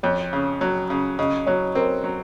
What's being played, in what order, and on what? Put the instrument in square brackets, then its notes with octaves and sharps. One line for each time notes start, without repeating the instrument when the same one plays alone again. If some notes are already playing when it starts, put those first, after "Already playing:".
[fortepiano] F2 [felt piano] C#5
[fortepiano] C#3
F#3
C#3
[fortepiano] C#3 [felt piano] D#5
[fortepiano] F#3 [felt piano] C#5
[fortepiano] C4 [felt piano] A#4
[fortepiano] F#3